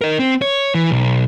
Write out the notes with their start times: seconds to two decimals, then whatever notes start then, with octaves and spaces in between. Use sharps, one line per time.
0.01 A#4 D#5
0.19 C4
0.42 C#5
0.75 E3
0.91 B1